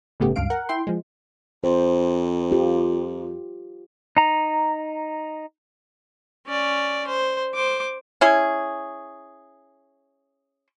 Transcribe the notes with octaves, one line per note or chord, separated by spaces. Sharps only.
G1 A2 C#3 A3 B3 G4
C#2 G2 F5 D7
A#4 F#5
E4 G5 C6
F3 G#3
F2 C5
F4 G4
D#4 A#5
C#4 D5
C5
C5 D6
C#4 E4 G#4